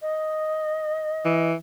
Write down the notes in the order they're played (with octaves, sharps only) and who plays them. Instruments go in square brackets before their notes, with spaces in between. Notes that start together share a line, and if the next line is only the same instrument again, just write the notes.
[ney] D#5
[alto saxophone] E3